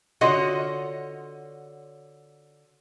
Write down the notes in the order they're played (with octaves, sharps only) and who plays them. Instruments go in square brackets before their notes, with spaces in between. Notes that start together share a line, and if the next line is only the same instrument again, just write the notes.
[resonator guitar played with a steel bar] D3 F4 F#4 C#5 D#5 F#5